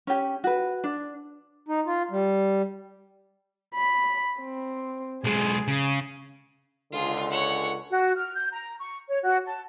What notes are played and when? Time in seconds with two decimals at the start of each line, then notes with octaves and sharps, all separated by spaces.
0.07 C#4 G4
0.44 F#4 B4
0.84 D4
1.68 D#4
1.86 F4
2.11 G3
3.75 B5
4.40 C4
5.24 B1 G#3 G#4
5.68 C#3
6.92 C#2 D3 F4 G#4
7.30 C#5 F#5
7.90 F#4
8.16 F6
8.35 G6
8.53 A#5
8.80 C#6
9.08 C#5
9.23 F#4
9.46 A5